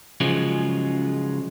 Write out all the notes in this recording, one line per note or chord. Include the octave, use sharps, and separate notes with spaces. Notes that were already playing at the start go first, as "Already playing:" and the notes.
C#3 F3 F#3 G#3 F4